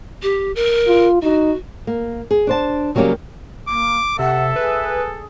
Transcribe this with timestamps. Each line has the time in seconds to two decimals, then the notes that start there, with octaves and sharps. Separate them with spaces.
0.22 G4
0.55 A#4
0.87 F4
1.22 D#4 F#4
1.87 A#3
2.31 G#4
2.47 D4 C5 A5
2.95 C#3 F#3 G3 A#3 C#4 G4
3.68 A#3 D6
4.19 C3 A4 E5 F#5
4.56 G#4 B4